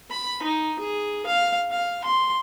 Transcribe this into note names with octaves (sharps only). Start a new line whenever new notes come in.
B5
D#4
G#4
F5
F5
C6